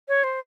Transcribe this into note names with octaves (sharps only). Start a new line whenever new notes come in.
C#5
C5